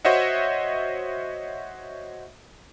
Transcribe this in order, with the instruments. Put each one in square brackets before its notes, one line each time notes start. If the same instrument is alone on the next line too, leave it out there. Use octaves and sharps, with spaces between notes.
[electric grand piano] F#4 C5 C#5 D#5 E5 F#5